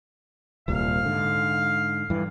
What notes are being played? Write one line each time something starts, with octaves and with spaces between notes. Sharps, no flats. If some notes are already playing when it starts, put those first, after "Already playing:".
D#1 C2 A#2 F5
G#2 D3
G2 E3